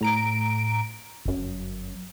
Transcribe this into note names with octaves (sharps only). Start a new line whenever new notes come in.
A2 A#5 D7
G1 F#2